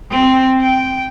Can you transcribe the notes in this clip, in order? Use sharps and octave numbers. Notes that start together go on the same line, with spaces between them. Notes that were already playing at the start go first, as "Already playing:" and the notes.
C4
G5